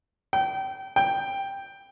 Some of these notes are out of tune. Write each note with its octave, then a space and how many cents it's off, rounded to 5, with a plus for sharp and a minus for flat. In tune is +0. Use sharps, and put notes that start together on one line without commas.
G5 -25
G5 +5